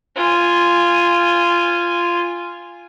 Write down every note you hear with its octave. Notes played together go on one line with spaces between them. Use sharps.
F4 G#5